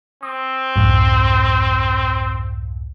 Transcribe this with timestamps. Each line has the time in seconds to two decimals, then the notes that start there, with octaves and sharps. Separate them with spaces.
0.23 C4 D#6
0.76 C2 F2 G#2